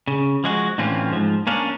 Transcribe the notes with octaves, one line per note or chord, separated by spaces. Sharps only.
C#3
F3 G#3 F#4
A2 D3 E3 C4 C#4 F4
G#2 F3
A#3 C#4 D4 F5